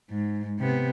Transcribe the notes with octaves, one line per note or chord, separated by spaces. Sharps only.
G#2
C3 B3